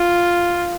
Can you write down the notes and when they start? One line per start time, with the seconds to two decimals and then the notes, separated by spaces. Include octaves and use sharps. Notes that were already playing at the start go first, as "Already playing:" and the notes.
Already playing: F4